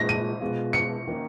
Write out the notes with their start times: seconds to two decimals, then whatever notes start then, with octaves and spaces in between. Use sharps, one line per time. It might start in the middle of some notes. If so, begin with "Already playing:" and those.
Already playing: A#2 G#3 D#4 A#6
0.09 D#7
0.41 B2 G#3 B3 F4
0.73 C#7
1.07 D#3 A#3 C#4